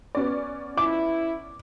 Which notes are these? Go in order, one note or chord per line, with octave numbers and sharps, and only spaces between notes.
B3 C#4 D5
E4 D6